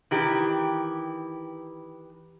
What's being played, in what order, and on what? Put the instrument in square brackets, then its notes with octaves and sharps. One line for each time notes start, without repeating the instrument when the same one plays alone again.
[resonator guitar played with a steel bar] D#3 E3 G4